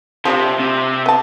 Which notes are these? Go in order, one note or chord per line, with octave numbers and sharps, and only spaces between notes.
C3 F3 G3 D4
C3
B3 A5